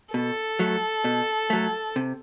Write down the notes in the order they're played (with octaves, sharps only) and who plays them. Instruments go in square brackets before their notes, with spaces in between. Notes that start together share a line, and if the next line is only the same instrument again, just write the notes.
[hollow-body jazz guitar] B2 [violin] A4
[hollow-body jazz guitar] F#3 A3
B2
F#3 A3
C3